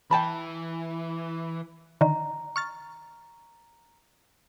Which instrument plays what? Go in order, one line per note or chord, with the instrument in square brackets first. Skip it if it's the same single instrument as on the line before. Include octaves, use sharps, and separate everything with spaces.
[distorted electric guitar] E3 [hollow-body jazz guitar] G5 A5 B5
[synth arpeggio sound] D3 D#3 [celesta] A#5
[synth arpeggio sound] C#6 F6 A6